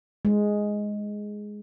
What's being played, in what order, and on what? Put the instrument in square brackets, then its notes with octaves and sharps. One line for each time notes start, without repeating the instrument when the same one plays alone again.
[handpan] G#3